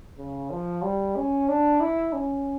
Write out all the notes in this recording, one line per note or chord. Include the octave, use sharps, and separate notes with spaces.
C#3
F3
G3
C#4
D4
E4
C#4